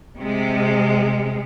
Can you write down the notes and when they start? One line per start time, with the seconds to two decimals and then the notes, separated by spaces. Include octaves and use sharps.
0.19 C3 G#3